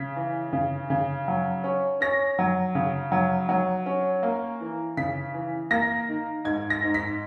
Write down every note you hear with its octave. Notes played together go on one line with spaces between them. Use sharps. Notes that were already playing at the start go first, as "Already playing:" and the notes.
Already playing: C#3 B6
E3
C#3
C#3
F#3
C#4
C#4 A#6
F#3
C#3
F#3
F#3
C#4
A#3
E3
C#3 B6
E3
A#3 A#6
D#3
G#2 G#6
A#6
G#2
B6